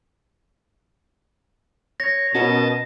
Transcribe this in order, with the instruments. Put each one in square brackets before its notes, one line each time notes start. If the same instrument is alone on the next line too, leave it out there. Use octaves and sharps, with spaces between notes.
[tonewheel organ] C#5 [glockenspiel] A#6
[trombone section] B2 [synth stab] C#4 F#4 A#4 [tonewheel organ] D#5 A5